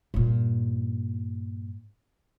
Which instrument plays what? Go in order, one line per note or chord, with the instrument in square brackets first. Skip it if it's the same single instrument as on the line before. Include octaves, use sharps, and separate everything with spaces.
[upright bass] G2 A#2